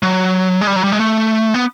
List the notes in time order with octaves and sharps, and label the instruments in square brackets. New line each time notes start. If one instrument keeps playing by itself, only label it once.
[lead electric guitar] F#3
G#3
G3
F#3
G3
G#3
A3
B3